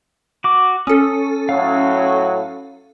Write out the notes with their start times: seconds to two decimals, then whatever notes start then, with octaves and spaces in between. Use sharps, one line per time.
0.44 F#4 D6
0.87 C#4 A4 D#6
1.49 A2 F#3 F5